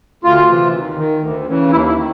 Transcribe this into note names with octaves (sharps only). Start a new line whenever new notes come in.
D2 F4
C3 E3
D#2
D#3
D2
C#3 E3
D#2 E4
E4
D#3